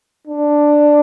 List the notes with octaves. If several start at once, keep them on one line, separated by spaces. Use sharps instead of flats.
D4